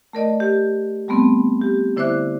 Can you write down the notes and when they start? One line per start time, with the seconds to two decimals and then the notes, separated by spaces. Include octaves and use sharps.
0.13 A3 A#4 D5 D#5
0.40 G4
1.08 G3 A3 B3 C4
1.61 G4
1.97 D3 E4 C5 E5 D6 F#6